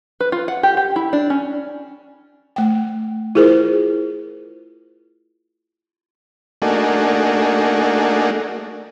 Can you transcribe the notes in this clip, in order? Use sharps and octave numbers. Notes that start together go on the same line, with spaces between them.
B4
F4
F#5
G4
G4
E4
D4
C#4
A3 G5
E4 F4 G#4 A#4 C5
A3 A#3 D4 D#4 F#4 G#4